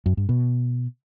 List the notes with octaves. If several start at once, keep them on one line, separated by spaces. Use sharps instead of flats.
F#2
G2
B2